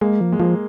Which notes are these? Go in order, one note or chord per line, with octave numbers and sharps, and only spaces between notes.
G#3 A#3
F3
G#3
F3 A#3